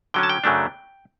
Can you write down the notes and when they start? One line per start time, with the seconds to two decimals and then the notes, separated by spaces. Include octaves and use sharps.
0.14 D3 F#3 C#4 G5
0.23 A5
0.29 G5
0.44 F#2 C#3 F#3 A3 D4